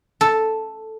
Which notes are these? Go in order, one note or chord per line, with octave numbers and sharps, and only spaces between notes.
A4